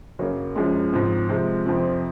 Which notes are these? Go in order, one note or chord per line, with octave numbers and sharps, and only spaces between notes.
F#2 C#3 F#3 A#3
F#2 F3 G#3
G#2 F3 C4
C3 F3 G#3 C4
F2 C3 F3 C4